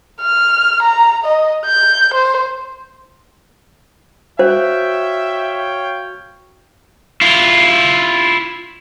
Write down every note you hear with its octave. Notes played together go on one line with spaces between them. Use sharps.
F6
A#5
D#5
G6
C5
F#4 C5 C#5 E5 F5 G5
E4 F4